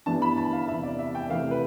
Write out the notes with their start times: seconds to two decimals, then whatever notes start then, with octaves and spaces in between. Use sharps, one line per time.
0.06 G2 E3 G3 B3 D4 A5
0.22 B5
0.37 A5
0.53 F5
0.68 E2 C3 E3 E5
0.83 D5
0.99 E5
1.15 G5
1.30 C3 E3 A3 F5
1.51 B4